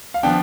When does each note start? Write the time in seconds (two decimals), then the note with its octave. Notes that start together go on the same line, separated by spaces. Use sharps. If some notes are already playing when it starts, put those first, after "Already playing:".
0.14 F5
0.23 F3 B3 D4 G5